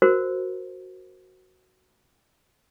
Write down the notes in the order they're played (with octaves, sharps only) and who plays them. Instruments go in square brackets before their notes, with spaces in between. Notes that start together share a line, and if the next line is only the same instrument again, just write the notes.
[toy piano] F#4 A#4 C5